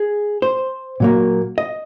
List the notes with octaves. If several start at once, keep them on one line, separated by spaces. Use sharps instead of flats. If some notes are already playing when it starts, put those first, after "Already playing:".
Already playing: G#4
C5
A#2 F#3 A#3
D#5